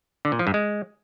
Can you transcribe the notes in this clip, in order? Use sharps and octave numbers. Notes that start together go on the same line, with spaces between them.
D3
A#2
F3
G2
G#3